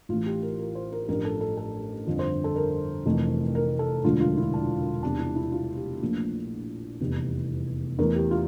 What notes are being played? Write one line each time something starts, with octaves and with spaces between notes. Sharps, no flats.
A1 A2 E3 A3 F4
G4
A#4
A#4
C5
A#4
A1 G2 F3 A#4
A4
A4
A4
G1 F2 D3 F3
C5
A4
A#4
F1 F2 E3 A3
A#4
A4
E1 D2 D3 F3 A3 F4
F4
E4
D4
E2 C3 G3 D4
E4
E4
F4
G4
A#1 A#2 F3 A3
F1 E2 E3 G3
E2 E3 A3 A#4
G4
F4